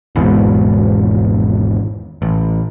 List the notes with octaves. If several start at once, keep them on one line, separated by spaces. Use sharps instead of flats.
G#1 E2 G#2 B2
A1